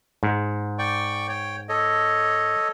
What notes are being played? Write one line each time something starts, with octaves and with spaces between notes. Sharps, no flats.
G#2
D5 G5 C#6
C#5 G5
A4 C#5 D#5